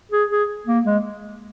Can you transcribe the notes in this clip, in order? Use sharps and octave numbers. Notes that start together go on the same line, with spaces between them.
G#4
G#4
A#3
G#3